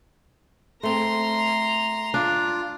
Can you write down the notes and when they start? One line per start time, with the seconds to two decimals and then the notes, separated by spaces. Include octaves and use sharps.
0.83 A3 C4 A#5 C6
2.14 D4 F4